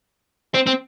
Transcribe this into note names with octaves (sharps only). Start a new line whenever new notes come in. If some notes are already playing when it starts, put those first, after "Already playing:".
C4
C4